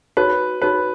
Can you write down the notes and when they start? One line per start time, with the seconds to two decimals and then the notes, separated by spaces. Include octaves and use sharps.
0.17 D#4 F#4 B4 C#5
0.62 D#4 F#4 B4 C#5